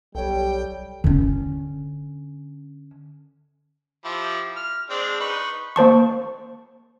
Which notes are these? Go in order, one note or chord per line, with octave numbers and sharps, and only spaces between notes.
B1 G3 A4 C#5 G5
D3 C#4
F3 E4 G4
F6
G#3 C4 D4
D#4 B4 C#6
A#3 C5 A5 C#6